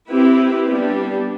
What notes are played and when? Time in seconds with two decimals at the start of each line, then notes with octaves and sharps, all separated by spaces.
0.10 C4 E4 G4 B4
0.68 G3 B3 D4